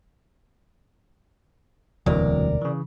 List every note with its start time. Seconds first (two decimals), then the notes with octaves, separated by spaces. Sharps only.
2.06 E1 D2 C3 E3 F#3 C4 A#4 D5
2.61 C#3 E3